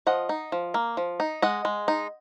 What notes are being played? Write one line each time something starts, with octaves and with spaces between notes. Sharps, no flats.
F3 D#5 F#5
D#4
F3
A#3
F3
D#4
G#3 D#5 F#5
G#3
D#4